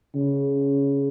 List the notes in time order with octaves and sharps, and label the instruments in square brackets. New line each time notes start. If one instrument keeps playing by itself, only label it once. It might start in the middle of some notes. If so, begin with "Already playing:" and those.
[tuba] C#3